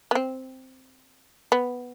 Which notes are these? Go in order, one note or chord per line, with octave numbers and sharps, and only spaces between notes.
B3
C4
B3